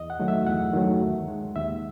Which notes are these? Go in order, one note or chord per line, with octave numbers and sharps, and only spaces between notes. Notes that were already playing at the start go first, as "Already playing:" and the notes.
Already playing: E2 D#5
F#5
D#3 F#3 A3
E5
E2 F#5
D#3 F#3 A3
D#2
D#3 G#3
D#2 E5